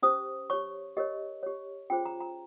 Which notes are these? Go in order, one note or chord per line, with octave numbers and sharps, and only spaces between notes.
C#4 G4 C5 D#6
G4 C#5 C#6
G4 A#4 C#5 D#5
G4 C#5
C#4 F4 G#4 C5 G5
A#5
A#5